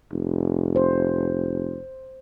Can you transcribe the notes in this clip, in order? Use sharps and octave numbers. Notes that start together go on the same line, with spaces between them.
F1
C5